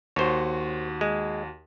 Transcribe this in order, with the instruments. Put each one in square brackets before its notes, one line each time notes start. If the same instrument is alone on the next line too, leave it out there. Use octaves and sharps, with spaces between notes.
[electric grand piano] D#2 F#4 [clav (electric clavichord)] C5 C#5
[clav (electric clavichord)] G#3